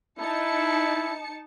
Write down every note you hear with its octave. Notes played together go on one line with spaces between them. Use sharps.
D#4 E4 A5 C#7